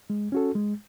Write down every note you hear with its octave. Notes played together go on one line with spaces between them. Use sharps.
G#3
C#4 F#4 A4
G#3